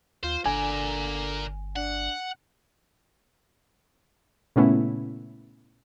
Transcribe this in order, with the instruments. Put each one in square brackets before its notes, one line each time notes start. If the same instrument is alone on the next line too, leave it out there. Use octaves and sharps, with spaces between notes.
[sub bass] D#2 [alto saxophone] F4 [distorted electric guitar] C5
[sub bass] G1 [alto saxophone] D3 [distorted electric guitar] A#4 D5 [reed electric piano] G#5
[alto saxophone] D4 [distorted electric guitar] F#5
[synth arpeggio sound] A#2 C#3 A3 B3 C#4 E4